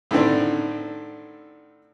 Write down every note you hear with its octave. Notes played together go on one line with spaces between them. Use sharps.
A2 D3 D#3 C4 D4